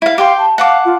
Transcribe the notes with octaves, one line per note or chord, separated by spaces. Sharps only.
E4 F5
G4 F5 G5 C6
A5
F5 F#5 A5 D6
F4